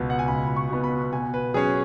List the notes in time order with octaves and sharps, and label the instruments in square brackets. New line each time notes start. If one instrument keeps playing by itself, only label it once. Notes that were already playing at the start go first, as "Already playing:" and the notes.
Already playing: [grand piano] C#2 B2 B3
F#5
G#5
C#2 B5
B5
C#6
B2 B3
B5
B2 G#5
B4
F#3 C#4 G#4